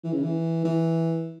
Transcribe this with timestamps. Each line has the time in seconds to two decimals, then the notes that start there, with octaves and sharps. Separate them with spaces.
0.04 E3
0.13 C#3
0.23 E3
0.65 E3